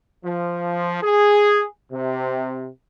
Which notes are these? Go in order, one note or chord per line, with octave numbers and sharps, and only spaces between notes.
F3
G#4
C3